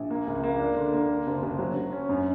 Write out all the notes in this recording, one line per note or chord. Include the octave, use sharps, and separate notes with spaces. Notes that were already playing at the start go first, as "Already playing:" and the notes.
Already playing: A#1
A#3
C#2
A#3
D4
D3
A#3
D3
F#1
F#1
F#3
F#3
C#4
F#2